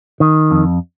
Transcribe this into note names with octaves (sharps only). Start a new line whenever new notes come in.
D#3
F2